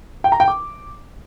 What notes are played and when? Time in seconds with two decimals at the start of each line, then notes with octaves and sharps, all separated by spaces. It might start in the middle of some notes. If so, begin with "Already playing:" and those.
0.24 G5
0.32 A#5
0.40 G5
0.48 D6